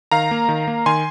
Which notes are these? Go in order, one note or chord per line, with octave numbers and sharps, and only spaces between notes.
D#3 F5 A#5
A#3
D#3
A#3
D#3 G#5 C6